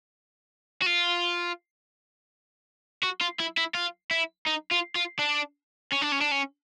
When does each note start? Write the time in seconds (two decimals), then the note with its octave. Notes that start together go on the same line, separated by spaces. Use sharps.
0.82 F#4
0.86 F4
3.03 F#4
3.21 F4
3.39 E4
3.57 E4
3.75 F4
4.11 E4
4.47 D#4
4.71 F4
4.96 F4
5.19 D4
5.92 C#4
6.01 D4
6.12 C#4
6.21 D4
6.31 C#4